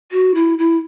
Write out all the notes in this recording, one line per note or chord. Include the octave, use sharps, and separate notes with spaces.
F#4
E4
E4